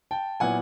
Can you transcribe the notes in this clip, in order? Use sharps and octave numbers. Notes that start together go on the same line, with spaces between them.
G5 A5
A#2 F#3 B3 E4 F#5 G#5